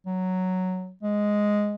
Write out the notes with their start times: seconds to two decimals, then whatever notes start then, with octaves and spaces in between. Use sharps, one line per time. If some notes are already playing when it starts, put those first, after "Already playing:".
0.06 F#3
1.03 G#3